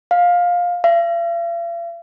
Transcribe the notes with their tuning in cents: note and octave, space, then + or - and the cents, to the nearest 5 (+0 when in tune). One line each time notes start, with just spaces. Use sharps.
F5 +15
F5 -45